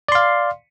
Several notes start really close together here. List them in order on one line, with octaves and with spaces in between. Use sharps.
D5 C6 F5